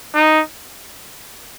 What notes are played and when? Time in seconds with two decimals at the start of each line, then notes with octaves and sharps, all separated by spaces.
0.15 D#4